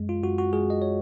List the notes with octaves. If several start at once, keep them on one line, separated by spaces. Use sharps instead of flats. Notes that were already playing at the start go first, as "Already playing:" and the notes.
Already playing: F#2 G#3
F4
F#2 F#4
F#4
G#3 G#4
D#5
C#5